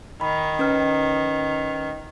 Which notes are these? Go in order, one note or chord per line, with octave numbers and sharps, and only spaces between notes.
D#3 B5
C#4 B4 F6